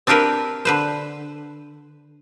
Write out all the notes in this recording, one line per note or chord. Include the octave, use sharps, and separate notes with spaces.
C4 D4 F4 G4 A#4 B4
D3 B4 C5